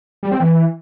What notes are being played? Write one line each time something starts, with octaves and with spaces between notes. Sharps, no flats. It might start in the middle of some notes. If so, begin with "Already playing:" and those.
G3
C4
E3